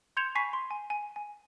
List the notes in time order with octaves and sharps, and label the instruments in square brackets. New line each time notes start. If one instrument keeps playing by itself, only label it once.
[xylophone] C6 G6 G#6 C#7 E7 F7
G#5 B5 C#6 B6 C7
C6
G#5
G#5
G#5